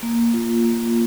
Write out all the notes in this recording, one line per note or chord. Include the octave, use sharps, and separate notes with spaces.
A#3
F4
A#3